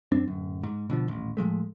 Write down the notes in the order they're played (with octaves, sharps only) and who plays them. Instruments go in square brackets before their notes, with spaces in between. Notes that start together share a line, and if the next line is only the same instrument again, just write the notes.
[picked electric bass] F#2 C4 D4
D1 F#2
G#2
B2 D3 F3
D#1 A1
A2 F3 G#3 A3